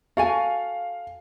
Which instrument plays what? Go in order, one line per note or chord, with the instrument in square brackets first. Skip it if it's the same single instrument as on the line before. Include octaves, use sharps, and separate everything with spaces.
[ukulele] F#4 A4 G#5 [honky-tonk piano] F5